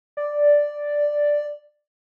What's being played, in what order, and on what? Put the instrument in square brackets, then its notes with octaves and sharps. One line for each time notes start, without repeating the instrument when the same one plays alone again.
[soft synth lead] D5